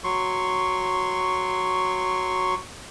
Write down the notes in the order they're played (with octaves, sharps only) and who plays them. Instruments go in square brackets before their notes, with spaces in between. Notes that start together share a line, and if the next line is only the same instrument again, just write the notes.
[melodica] F#3 C6 C#6